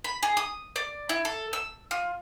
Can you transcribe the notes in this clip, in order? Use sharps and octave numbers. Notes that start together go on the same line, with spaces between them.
B5
G#4
D#6
D5
E4
A4
E6
F4